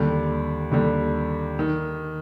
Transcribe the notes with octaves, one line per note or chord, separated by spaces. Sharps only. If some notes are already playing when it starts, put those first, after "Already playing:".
Already playing: D#2 D3 G3
D#2 D3 G3
D#3